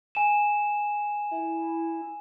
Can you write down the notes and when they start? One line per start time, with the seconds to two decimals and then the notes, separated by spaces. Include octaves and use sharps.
0.15 G#5 E7
1.31 E4